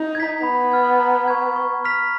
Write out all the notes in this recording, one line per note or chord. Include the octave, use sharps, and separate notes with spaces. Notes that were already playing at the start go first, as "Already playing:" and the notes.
Already playing: D#4
G#6 B6
B3 B5
F6 G#6
A#5
C#6 G#6
C#6
F6 B6 F7